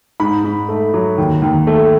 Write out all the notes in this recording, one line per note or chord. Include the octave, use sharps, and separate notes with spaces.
G#2 B5
G#2
A3
F#3
D#2
D#2
A3